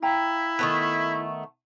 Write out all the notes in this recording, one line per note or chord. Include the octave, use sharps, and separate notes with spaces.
E4 F5 G5 A#5
D#3 A3 B3